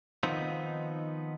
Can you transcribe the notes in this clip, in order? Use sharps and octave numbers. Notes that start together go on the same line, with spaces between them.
D#3 F3 B3 C4 D#4